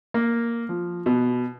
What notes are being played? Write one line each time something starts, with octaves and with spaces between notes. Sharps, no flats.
A#3
F3
B2